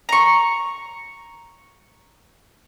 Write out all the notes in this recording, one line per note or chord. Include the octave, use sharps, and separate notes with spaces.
A#5 C#6